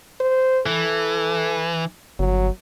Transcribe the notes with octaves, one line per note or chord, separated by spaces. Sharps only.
C5
E3 A4
G1 F#3